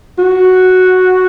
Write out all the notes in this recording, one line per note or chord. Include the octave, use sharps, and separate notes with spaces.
F#4